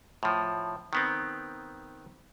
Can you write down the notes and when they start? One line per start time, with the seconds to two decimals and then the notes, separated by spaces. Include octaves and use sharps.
0.23 A2 F3
0.93 D#3 B3 C4